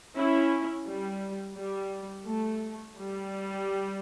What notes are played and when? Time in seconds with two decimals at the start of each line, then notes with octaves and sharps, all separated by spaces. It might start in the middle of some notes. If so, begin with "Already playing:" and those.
0.15 C#4 E4
0.85 G3
1.56 G3
2.26 A3
2.96 G3